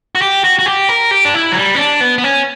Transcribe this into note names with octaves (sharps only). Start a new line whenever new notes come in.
F#4
G4
F#4
F#4
G4
A#4
G4
D4
E4
F#3
G3
C#4
D4
B3
B3
C#4